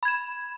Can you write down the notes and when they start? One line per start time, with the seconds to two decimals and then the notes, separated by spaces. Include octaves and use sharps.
0.03 B5
0.05 G#6
0.08 E7